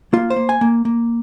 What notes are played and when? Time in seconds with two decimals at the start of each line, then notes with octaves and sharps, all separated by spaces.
0.13 A#3 F4
0.30 C5
0.36 A#3
0.49 G#5
0.61 A#3
0.85 A#3